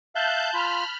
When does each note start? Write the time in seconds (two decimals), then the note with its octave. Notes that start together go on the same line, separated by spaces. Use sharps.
0.15 E5 F5 A5 F#6 G6
0.54 F4 B5 F6